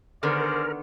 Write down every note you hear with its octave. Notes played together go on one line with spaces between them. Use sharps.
D3 D#3 B3 G#4 A#4 C5 D5